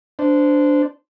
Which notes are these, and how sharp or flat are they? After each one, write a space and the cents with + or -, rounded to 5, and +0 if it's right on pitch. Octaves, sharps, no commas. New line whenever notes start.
D4 -5 C5 -20